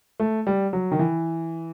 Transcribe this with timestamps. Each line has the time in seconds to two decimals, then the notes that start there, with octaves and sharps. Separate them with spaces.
0.20 A3
0.47 G3
0.73 F#3
0.91 D#3
0.99 E3